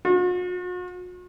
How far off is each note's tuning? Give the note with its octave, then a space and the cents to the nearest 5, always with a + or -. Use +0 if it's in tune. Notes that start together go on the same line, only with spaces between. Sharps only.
F#4 -45